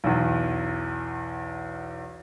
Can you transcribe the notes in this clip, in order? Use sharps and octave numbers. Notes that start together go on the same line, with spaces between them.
B1 E2